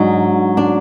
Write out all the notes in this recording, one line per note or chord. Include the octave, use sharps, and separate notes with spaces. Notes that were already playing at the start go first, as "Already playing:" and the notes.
Already playing: G#2 F#3 D4 D#4
D4